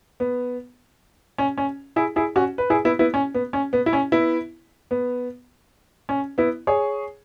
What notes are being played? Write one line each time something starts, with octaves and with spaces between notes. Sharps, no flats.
B3
C#4
C#4
E4 G#4
E4 G#4
C#4 F#4
B4
E4 G#4
B3 E4
B3 E4
C#4
B3
C#4
B3
E4
C#4
B3 E4
B3
C#4
B3 E4
G#4 C#5